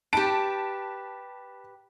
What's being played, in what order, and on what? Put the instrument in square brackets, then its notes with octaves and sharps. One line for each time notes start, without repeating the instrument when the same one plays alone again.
[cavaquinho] G4 B4 [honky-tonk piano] A5 D7